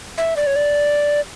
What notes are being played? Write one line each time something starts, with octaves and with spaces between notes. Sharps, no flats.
E5
D5
C#5
D5